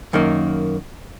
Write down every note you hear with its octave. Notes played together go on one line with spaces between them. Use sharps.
F#2 D#3 A#3